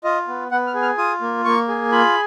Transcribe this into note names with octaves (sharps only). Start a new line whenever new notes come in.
F4 D#5
B3
B3 F#5
F6
G#4
F6
F4 D#6
A#3
A#3 C#6
G#4
F4 B5